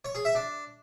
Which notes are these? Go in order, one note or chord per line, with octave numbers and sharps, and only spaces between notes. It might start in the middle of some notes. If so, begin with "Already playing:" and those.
C#5
G#4
E5
D4